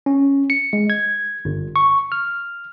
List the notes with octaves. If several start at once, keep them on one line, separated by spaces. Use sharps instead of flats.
C#4
C#7
G#3
G#6
G1
C#6
F6